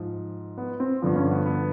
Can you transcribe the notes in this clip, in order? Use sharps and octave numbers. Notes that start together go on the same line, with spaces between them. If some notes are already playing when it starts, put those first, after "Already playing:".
Already playing: G#2 F3
B3
C4
G2 D3 F3 B3
C#4
B3
B3